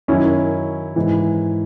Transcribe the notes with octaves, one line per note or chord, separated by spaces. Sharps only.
F#2 D#3 F#3 C#4 E4
G#2 E3